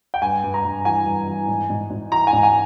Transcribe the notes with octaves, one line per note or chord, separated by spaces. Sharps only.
G5
G2 G#5
G2
A#5
G2
E3 G#5
G2
E3
G#2
G#2
G#2
E3 A#5
G#5
G#2
G#5